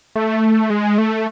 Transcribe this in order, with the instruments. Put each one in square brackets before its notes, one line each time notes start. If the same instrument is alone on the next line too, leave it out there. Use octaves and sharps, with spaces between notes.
[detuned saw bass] A3
G#3
A3